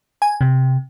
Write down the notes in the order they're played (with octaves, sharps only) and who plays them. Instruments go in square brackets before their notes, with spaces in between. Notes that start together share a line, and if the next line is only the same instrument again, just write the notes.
[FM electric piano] G#5
C3